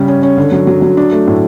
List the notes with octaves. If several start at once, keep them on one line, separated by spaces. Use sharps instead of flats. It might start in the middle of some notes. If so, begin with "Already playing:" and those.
Already playing: C#3 G3
C#4
C#4
D3
F#3
F#3
F#3
D4
A3
A2